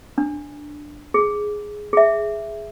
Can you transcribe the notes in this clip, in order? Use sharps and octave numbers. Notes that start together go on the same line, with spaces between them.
D4
G#4
G#4 E5